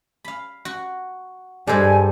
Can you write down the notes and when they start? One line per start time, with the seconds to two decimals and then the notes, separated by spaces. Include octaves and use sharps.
0.25 F5 B5
0.65 F#4
1.67 G2 G3 G#3 D4 A4 C5 G#5